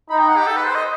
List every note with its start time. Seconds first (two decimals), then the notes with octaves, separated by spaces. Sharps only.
0.10 D#4 B5
0.18 G5
0.28 F#5
0.37 G4
0.47 A4
0.56 B4
0.65 C5
0.75 D#5